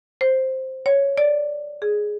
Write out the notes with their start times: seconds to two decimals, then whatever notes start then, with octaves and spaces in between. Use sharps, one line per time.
0.21 C5
0.86 C#5
1.18 D5
1.82 G#4